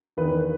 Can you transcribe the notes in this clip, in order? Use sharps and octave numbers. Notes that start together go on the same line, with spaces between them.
E2 D#3 B4